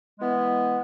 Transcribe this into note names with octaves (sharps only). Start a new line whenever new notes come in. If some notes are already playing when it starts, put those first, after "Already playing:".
E3 G#3 B3